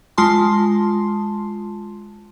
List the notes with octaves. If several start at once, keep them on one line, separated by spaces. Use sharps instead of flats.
G#3 F4 A5 C6